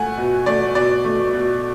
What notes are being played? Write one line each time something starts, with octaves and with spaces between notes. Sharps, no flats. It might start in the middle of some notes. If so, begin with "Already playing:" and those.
Already playing: A3 F#5 G#5
B2
A3 D5
B2 D5
A3
B2